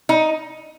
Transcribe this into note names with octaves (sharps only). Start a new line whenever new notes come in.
D#4